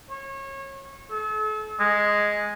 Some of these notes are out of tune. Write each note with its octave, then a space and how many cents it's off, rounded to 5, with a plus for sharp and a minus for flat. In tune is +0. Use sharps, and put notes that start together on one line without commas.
C#5 -25
A4 -40
G#3 +0